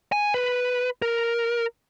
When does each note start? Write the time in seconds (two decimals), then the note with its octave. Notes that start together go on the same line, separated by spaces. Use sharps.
0.12 G#5
0.34 B4
1.02 A#4